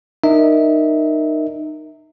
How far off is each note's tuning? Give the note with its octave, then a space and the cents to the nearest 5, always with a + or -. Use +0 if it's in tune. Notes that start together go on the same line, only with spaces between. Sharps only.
D#4 -25 A#4 +0 E5 -25